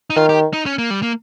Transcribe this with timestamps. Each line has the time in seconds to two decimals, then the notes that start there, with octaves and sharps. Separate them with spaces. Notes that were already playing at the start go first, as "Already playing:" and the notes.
0.10 D#4
0.16 D#3 F4
0.29 G4
0.53 D#4
0.66 C#4
0.78 A#3
0.91 G3
1.03 A#3